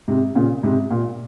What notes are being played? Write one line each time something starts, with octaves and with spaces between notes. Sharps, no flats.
G#2 C3
A#2 C#3
G#2 C3
A#2